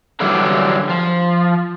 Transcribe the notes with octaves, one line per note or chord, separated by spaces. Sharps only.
D3 E3 F#3 G3
F3